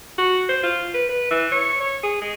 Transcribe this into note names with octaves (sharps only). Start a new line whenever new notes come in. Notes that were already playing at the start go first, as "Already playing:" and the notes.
F#4
C5
F4
B4
B4
E3
C#5
C#5
G#4
G#3